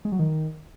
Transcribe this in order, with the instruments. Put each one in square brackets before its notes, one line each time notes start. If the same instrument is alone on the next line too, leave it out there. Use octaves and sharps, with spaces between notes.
[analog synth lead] G#3
F#3
D#3